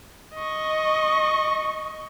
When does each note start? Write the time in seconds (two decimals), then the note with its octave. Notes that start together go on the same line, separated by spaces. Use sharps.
0.35 D#5 C#6